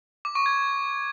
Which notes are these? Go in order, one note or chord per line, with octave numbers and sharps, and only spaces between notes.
D6
C#6
G#6